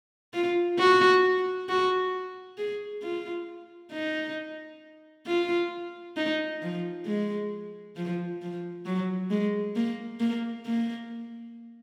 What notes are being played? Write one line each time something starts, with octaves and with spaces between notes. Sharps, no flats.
F4
F#4
F#4
G#4
F4
D#4
F4
D#4
F3
G#3
F3
F3
F#3
G#3
A#3
A#3
A#3